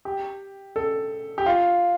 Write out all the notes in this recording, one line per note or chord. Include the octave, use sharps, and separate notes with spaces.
G4
A4
G4
F4